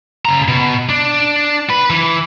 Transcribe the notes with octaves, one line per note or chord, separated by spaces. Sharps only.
C#3 A#5
B2
D4
B4
E3